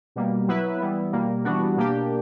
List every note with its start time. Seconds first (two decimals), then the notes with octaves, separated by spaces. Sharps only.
0.16 B2 G3 A#3
0.48 F#3 B3 E4 B4 E5
0.80 E3 G3 B3 E4
1.12 B2 G3 A#3
1.44 E3 G3 B3 D4 F#4
1.77 B2 A#3 D4 G4